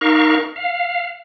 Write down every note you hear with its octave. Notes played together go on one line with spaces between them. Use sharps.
D#4 A#4 F5 C#6
F5